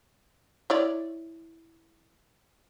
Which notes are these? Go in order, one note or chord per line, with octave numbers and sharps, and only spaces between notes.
E4 C#5 D5